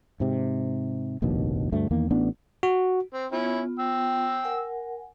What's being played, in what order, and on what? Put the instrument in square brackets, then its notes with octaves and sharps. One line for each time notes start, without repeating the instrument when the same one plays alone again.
[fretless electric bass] G#2 C3
F1 A#1 D#2 B2
D2 G2 A3
E2 D#3 A#3
A1 B3 D4
[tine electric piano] F#4
[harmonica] C4
[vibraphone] B3 F4 [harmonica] C#4 E4
[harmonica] G5 E6
[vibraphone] A#4 F#5 G#5